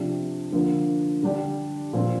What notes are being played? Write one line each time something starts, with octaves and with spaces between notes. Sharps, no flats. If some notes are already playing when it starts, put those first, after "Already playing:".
Already playing: C3 F3 D4 G4
D3 F3 A#3
D3 G3 D4 G4
A#2 F3 C4 F4